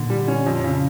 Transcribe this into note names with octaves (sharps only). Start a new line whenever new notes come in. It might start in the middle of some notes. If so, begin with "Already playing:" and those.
Already playing: A#2 D3
G3
C#4
F2
C#3